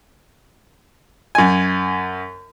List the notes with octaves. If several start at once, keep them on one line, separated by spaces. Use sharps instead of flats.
F#2 G#5